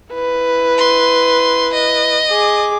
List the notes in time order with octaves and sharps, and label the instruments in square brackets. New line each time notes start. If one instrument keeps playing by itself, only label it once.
[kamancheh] E4 B4
[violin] C6
D#5
[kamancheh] G#4 D6